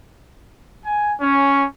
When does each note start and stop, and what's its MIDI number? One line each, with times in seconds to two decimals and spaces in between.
0.84 1.14 80
1.20 1.65 61